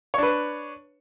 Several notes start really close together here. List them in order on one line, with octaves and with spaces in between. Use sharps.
C#5 D4 B4